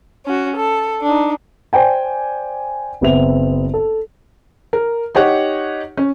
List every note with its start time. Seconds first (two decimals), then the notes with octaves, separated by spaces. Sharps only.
0.25 C#4 F#4
0.55 A4
1.01 D4 D#4
1.73 C5 D5 G5 G#5
3.01 F#1 B3 C4 E5 F7
3.74 A4
4.73 A#4
5.15 D#4 G4 C#5 F#5
5.97 C#4